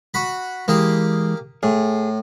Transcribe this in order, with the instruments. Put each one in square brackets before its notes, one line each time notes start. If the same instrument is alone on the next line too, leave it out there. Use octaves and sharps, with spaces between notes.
[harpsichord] F#4 B5
[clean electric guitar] E3 G#3 [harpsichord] A#3 G4 G#4
[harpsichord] A2 [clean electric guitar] G#4